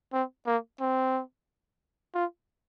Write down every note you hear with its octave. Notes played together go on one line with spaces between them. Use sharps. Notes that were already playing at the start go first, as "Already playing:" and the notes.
C4
A#3
C4
F4